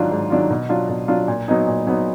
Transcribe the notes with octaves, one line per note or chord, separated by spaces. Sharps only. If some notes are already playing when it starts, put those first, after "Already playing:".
Already playing: G#2 D#3 F#3 D4 F4
G#2
D#3 F#3 D4 F4
B2
F#3 D4 F4
B2
F#3 D4 F4
A#2
F#3 B3 D#4
A#2
F#3 B3 D#4